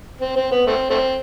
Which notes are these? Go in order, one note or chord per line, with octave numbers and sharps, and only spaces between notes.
C4
C4
B3
A3 C4
A3 C4